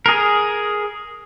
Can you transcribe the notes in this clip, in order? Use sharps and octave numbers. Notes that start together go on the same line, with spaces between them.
G#4 A#4